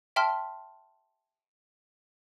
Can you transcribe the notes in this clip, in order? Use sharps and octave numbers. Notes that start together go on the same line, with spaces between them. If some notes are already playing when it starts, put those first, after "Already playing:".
E5 G5 A5 C6 F6 B6